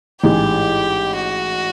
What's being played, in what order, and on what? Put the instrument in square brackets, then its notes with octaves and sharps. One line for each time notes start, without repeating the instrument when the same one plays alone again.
[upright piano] A1 G#2 E3 G#3 [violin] G4
[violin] F#4